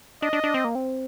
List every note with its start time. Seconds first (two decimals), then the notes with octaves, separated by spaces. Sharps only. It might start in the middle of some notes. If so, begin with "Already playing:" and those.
0.22 D4 D#5
0.33 D4
0.44 D4
0.54 C4
0.64 A#3
0.75 C4